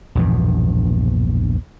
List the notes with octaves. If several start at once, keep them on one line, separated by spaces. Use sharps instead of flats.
A#1 E2 G2 B2